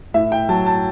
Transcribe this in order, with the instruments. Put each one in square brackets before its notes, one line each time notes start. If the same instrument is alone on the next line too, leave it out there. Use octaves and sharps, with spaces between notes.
[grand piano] A2 E5
G5
F#3 A5
A5